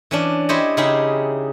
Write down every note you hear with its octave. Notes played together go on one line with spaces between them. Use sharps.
E3 C#4 D4
E4 G4 C5 C#5 D#5
C#3 D#4 E4 G4 G#4